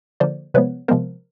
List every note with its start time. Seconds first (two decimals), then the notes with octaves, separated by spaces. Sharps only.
0.20 D3 F3 A#3 C5 D5
0.54 C3 F3 G#3 B3 B4 C#5
0.88 C3 F3 G#3 B3 A#4 C5